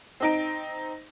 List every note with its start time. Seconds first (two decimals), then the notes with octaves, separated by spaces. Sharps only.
0.20 C4 D#4 D7